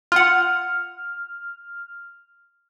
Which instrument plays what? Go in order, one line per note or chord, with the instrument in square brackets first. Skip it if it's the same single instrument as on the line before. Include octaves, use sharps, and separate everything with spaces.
[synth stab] F4 F#5 [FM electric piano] F6